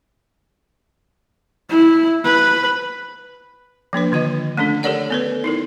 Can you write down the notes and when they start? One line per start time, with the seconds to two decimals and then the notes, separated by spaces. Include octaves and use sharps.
1.69 E4
2.25 B4
3.93 F3 A#3 D4 B4
4.12 D3 D#3 F4 D#5
4.57 A3 C#4 D4 A4
4.83 G4 A4 A#4 C#5 D5 F#5
5.10 B3 A4 B4
5.44 D#4 E4 A#4